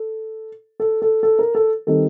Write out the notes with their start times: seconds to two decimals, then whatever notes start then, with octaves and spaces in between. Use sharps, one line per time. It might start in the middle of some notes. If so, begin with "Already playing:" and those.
Already playing: A4
0.80 A4
1.02 A4
1.23 A4
1.39 A#4
1.55 A4
1.87 D#3 G3 C4 D#4 A4